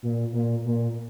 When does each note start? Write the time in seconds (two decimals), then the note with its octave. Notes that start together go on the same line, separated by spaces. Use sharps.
0.03 A#2
0.33 A#2
0.65 A#2